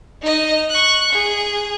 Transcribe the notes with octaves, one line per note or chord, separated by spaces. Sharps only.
D#4 D#5
C#6 F#6
G#4